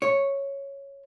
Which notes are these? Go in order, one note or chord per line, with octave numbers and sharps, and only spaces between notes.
C#5